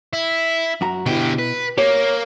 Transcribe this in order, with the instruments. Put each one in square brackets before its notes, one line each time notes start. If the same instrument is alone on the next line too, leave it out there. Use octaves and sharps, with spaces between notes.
[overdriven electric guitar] E4
[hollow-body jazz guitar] F#2 F#4 A#5
[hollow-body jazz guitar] B2 E4 [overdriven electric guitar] D3 G4
[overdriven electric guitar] B4
[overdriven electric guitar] A#3 [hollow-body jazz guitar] G4 C#5